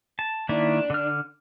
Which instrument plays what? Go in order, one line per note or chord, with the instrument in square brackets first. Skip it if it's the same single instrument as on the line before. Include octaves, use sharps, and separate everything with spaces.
[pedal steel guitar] A5
[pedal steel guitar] D#3 A#3 E4 [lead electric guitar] D4
[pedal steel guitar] D3 F6